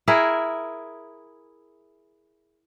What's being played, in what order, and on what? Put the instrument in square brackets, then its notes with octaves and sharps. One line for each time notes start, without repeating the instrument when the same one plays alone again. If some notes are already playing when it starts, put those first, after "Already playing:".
[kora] E4 G#4 A#4 E5